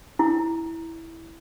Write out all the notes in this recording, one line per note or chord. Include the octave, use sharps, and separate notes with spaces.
E4